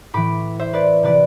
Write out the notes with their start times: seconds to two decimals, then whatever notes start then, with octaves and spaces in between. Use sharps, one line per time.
0.14 A2 E3 B5 D6
0.59 C5 E5
0.73 B4 D5
1.03 C3 E3 B4 D5